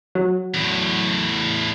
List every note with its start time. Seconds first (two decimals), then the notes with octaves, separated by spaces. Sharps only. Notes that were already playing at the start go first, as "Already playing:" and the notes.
0.15 F#3
0.54 E2 A2